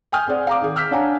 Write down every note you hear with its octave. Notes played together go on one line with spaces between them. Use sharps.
G5 G#5 D#6 F6 G6
C4 G#4 D5 F#5
F5 A#5 D6
D#3 G#4
E6 F6 G6 B6
D4 C#5 F5 F#5 G#5 A#5